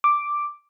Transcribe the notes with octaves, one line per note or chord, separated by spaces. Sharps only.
D6